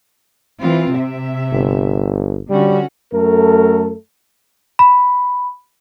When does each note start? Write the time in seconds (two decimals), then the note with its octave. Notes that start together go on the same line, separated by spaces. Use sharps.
0.61 E3 C4 F4
0.94 C3 E5
1.53 G1
2.50 D3 G3 C#4 F#4
3.13 F#2 A3 A4 A#4
4.79 B5